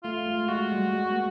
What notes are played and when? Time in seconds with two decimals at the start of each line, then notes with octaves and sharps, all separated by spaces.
0.04 A3 F4
0.27 G#3
0.49 G#3 F#4
0.72 G3
0.95 G#3
1.11 A#3